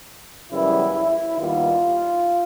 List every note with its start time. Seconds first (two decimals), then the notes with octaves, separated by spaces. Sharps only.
0.50 F#2 C#3 E3 G3 B3 E4
0.94 E4
1.37 D#2 D#3 G3 B3 F4